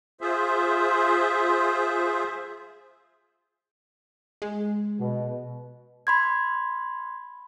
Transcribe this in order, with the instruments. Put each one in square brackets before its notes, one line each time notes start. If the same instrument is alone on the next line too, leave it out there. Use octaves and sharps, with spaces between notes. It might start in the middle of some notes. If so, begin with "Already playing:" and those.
[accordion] F4 G#4 C5 E5
[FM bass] G#3
[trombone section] B2
[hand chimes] B5 C6 G#6